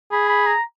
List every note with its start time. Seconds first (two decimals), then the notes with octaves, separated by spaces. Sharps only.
0.11 G#4 B5
0.29 B5
0.47 A#5